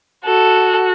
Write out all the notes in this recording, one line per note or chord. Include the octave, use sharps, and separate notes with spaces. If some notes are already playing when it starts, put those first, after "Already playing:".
F#4 A4